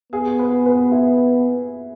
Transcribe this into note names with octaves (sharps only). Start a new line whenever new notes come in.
B3 G#4
B4
B4
E4